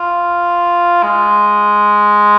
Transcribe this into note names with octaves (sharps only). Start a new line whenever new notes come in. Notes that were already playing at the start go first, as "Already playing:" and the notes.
Already playing: F4
G#3